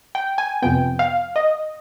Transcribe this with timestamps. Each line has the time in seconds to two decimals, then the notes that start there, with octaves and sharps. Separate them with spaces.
0.15 G5
0.38 G#5
0.62 F2 C3 F3 B3 G5
0.99 F5
1.36 D#5